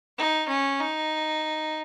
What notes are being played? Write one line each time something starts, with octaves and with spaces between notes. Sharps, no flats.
D#4
C#4
D#4